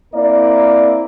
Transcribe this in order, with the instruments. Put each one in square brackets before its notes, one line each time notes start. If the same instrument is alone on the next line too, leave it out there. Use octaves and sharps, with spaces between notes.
[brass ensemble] A#3 C4 E4 A#4 D5